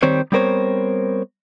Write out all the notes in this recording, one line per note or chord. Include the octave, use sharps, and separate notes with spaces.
D#3 G3 C4 C5 C#5
G3 B3 C4 A#4 C5 C#5